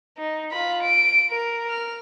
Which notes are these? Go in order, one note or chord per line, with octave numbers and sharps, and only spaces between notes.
D#4
F4 B5
D7
A#4
F6